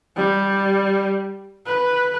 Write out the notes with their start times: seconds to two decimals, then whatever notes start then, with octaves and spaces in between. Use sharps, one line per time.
0.16 G3
1.66 B4